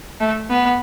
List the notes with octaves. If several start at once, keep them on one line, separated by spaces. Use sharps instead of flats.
A3
B3